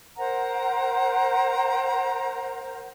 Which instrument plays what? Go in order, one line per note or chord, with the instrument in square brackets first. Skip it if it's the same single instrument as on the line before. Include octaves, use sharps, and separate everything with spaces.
[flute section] A#4 C5 F#5 A#5